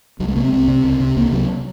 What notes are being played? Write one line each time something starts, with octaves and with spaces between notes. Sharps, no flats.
C2 F#3
G#3
C3 A#3
C4
C2
C3
C#2
C3
C#2 A#3
C3 F#3